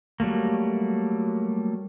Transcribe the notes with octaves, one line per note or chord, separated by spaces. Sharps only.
F#3 G3 A3 A#3